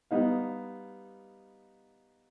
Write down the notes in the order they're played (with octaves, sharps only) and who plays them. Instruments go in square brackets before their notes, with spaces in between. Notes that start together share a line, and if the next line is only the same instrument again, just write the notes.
[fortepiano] G3 B3 D#4 F5